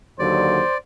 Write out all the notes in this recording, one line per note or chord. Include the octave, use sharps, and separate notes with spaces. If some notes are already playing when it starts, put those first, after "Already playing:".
D#2 D3 F#3 C5 D5